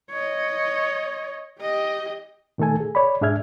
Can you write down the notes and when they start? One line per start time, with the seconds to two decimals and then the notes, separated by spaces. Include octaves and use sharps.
0.11 C#5 D#5
1.60 G4 D#5
2.58 A#2 D#3 A3 A4 G#5
2.80 G#4
2.95 C#5 D5 B5
3.21 G#2 D4 G#4 E5 F6 G#6